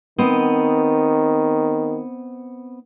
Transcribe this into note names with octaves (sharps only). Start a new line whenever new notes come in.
D#3 B3 C4 D#5